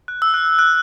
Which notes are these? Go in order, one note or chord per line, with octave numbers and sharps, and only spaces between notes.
F#6
E6
F#6
F#6